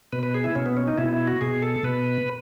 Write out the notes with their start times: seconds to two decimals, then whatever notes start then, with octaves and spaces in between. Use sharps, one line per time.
0.13 B2 B4
0.23 B4
0.34 G#4
0.44 E4
0.55 B2 C#4
0.66 B3
0.77 C#4
0.88 D#4
0.98 B2 E4
1.13 E4
1.27 F#4
1.41 B2 G#4
1.62 A4
1.83 B2 B4